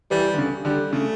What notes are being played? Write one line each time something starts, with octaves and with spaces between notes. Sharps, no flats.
E3 G3
D3
C#3
D3 G3
C#3 A3